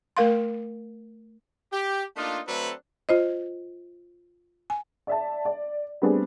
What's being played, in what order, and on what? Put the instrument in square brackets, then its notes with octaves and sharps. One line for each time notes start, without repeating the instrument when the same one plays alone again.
[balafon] A3 A#4 F5 C6
[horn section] G4
A3 A#3 D4 D#4 F4
F#3 A3 C4 D4 A4 B4
[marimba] F4 C5 D#5
G#5
[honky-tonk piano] D5 E5 A5
D5
G3 A3 B3 C4 D4 G#4